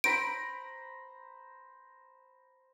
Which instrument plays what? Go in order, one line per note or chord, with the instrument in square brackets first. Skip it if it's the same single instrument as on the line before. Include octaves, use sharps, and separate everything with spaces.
[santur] C5 A#5 B5 [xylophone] D7